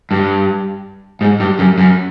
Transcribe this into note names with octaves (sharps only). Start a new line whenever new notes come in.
G2
G#2
G2
F#2
F#2